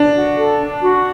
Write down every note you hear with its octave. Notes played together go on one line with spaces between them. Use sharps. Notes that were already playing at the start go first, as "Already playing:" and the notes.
Already playing: D4
F#4
A4
D4
F#4